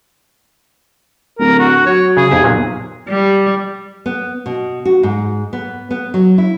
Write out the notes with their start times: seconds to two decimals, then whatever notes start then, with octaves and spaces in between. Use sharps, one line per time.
1.39 D1 A#4
1.59 F#4
1.86 F#3 C#5
2.17 C#3 G#4
2.31 B1 F2 G4 E5
2.43 B1 A#2 F#3 A#3
3.09 G3
4.06 B3
4.46 B2
4.85 F#4
5.03 G#2
5.53 B3
5.91 B3
6.14 F#3
6.38 E4